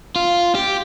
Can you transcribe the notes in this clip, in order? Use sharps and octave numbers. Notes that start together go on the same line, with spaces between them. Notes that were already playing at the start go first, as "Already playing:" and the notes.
F4
G4